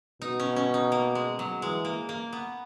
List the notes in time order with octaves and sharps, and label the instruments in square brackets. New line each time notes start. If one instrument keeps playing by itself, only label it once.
[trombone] B2 [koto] D#4
[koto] C#4
C#4
D#4
A#3
G#3
F#3
[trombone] E3 [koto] G#3
[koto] A#3
A#3
B3